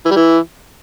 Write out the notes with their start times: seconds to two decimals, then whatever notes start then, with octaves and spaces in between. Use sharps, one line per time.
0.06 E3
0.11 G3
0.16 E3